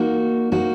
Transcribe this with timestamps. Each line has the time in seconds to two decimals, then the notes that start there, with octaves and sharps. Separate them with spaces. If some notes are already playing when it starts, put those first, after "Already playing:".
Already playing: A#3 D#4 F#4
0.52 A#3 D#4 F#4